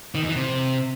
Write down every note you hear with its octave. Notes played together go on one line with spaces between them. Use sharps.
D#3
E2
E3
C3